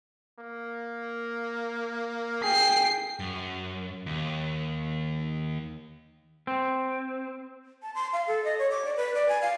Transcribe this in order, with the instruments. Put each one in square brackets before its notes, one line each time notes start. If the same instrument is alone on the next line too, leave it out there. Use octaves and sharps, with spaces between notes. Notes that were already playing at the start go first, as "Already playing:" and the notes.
[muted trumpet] A#3
[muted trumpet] G#4 [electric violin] G5 C7
[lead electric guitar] F#2
D#2
[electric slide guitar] C4
[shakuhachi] A5
C6
F5
A4
D#5
C#5
D6
D5
B4
D5
G#5
F5